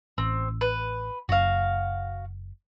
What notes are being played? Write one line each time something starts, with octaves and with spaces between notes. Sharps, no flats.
A1 C4
B4
F#1 F#4 F5